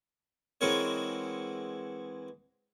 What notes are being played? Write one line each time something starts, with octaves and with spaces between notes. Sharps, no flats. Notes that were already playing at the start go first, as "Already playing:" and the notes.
E3 G#3 C4 F#4 A#4 C#5